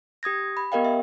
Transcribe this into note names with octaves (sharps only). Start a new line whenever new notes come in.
G4 D#6 G#6 A#6
B5
B3 G4 A#4 D#5 F5 G5
E5